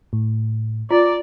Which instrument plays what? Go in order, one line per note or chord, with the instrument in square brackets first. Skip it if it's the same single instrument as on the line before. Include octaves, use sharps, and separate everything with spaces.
[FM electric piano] A2
[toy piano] F4 [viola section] D5 [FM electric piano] A#5